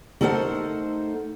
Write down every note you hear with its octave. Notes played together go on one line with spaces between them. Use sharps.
A3 D#4 A4 A#4 C5 F#5